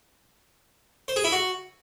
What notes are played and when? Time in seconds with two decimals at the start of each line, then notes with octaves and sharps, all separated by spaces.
1.08 C5
1.16 G#4
1.24 E4
1.32 F#4